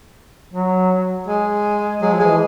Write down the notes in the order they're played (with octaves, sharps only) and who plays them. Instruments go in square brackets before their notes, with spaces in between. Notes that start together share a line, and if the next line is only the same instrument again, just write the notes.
[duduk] F#3
[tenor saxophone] G#3
[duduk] F#3 [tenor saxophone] G#3
[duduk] F3
[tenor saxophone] G#3
[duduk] E3